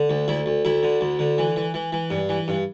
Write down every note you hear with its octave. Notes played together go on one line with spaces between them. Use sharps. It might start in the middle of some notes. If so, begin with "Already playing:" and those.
Already playing: D3
D2
D2 E4
D2
D2 E4
D3
D2
D3
E3
E3
E3
E3
G2
E3
G2